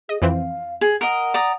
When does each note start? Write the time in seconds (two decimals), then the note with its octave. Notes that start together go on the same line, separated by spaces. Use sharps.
0.09 G#4 D#5
0.22 F2 E3 C4 F5
0.81 G#4
1.01 A#4 D#5 F#5
1.34 D5 A#5 D#6